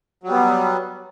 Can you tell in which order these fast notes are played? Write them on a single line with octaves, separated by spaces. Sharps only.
F#3 G3 B3